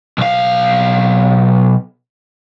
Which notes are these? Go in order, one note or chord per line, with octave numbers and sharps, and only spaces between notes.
B1 F5